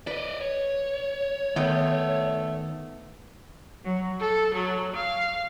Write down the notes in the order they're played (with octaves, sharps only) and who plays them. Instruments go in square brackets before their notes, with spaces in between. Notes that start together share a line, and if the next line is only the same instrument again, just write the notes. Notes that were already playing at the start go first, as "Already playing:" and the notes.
[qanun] B4 [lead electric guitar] D5 D#5
[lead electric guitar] C#5
[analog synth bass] D#3 [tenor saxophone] A3 [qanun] B3 G5
[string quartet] F#3
A4
F#3
F5